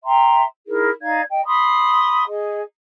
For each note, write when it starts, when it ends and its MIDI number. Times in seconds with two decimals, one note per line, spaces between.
0.05 0.42 76
0.05 0.42 79
0.05 0.42 82
0.05 0.42 84
0.66 0.89 63
0.66 0.89 64
0.66 0.89 68
0.66 0.89 70
1.01 1.20 63
1.01 1.20 74
1.01 1.20 77
1.01 1.20 92
1.29 1.44 75
1.29 1.44 79
1.46 2.23 83
1.46 2.23 84
1.46 2.23 87
2.27 2.61 68
2.27 2.61 75